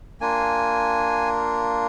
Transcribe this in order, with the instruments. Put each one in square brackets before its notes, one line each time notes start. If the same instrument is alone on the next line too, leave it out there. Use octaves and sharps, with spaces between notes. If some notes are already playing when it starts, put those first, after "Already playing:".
[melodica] A#3 D4 F4 G#5